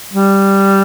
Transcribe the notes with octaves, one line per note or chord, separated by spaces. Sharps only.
G3